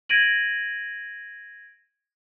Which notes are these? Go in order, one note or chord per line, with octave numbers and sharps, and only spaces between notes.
G#6 A#6 D7 D#7 F#7